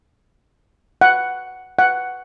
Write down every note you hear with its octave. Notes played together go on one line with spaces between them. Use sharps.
F#5
F#5